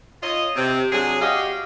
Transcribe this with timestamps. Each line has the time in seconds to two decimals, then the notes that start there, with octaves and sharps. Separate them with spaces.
0.22 F4 C#5 D#5
0.56 C3
0.92 C3 F#3 D4 G#4
1.21 F#4 G4 D5 D#5 F5